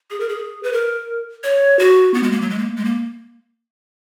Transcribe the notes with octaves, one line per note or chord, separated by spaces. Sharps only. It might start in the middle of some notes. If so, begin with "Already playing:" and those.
G#4
A#4
G#4
B4
A#4
C#5
F#4
B3
G#3
A#3
F#3
G#3
A#3
G#3
A#3